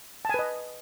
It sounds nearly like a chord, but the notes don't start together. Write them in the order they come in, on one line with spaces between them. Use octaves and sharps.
A5 G#5 B4 D#5